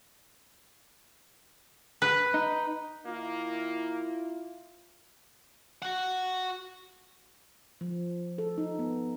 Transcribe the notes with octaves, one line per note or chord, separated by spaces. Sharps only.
B4
D#4
D#3 A#3 E4 F4
F#4 F#5
F3
A4
D#4
B3